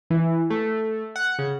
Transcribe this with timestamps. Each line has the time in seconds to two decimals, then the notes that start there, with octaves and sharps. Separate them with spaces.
0.10 E3
0.50 A3
1.16 F#5
1.39 C#3